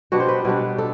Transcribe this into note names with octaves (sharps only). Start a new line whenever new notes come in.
B2 G3 B3 D4 F#4
C5
B4
B2 G3 B3 D4
D4 A4